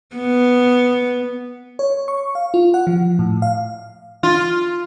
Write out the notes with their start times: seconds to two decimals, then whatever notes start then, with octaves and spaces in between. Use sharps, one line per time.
0.16 B3
1.79 C#5
2.08 C#6
2.35 F5
2.54 F4
2.74 F#5
2.87 F3
3.19 A2
3.42 F5
4.23 F4